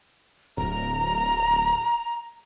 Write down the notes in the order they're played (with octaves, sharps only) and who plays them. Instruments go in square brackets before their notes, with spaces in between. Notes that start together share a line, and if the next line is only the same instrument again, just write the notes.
[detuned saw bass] D1 [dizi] A#5